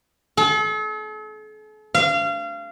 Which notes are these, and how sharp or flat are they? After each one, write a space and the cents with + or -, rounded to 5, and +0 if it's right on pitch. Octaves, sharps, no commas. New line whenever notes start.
A4 -45
F5 -30